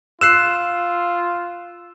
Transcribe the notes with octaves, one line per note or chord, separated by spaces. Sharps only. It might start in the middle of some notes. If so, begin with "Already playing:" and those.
F4 E6 F#6 C7 E7